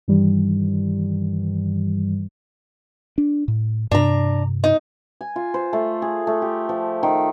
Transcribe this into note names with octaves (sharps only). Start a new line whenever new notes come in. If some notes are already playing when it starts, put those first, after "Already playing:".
G2 D#3 E3 G3
D4
A2
G2 C3 D4 A#5
D#4
G#5
F4
C5
A3
G#4
A3
G4
F3
D#3